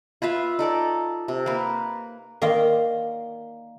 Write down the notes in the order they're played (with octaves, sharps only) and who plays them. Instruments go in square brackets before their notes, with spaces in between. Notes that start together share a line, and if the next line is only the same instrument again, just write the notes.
[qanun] F4 B4 E5 F5
D#4 A4 D5
C3
A#3 B4
[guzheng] D#3 A#3 D#4 D5 F5 C6